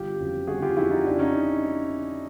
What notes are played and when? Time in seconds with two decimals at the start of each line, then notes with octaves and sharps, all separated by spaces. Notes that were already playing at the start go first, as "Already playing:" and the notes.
Already playing: G1 F4 G4
0.19 F2 C#3 F#3
0.47 G1 F#4 G#4
0.62 F4 G4
0.76 F2 C#3 F#3 E4 F#4
0.91 D#4 F4
1.05 F2 D4 E4
1.19 C#4 D#4